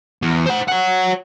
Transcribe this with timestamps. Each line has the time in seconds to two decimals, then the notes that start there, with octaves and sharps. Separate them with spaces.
0.22 E2
0.46 C5 F#5
0.68 C#5 F#5